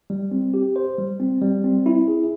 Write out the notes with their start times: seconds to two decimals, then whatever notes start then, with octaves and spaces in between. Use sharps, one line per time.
0.10 G3
0.31 C4
0.54 G4
0.76 C5
0.98 G3
1.20 C4
1.41 G3
1.64 C4
1.86 E4
2.08 G#4